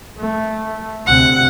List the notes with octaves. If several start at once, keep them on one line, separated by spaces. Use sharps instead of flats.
A3
D2 C3 F#5